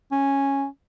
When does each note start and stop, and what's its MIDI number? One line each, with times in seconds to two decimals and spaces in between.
0.12 0.66 61